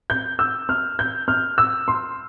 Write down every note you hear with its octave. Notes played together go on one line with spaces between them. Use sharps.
G6
E6
F6
G6
F6
E6
C6